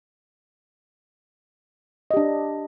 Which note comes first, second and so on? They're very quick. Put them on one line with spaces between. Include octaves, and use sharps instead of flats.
D#5 G4 D4